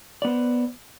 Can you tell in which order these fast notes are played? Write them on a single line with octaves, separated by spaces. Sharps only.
D5 B3 C5